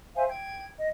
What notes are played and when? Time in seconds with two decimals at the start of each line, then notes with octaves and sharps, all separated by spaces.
0.16 C5 E5 F5 G#5
0.29 G5 G#6
0.78 D#5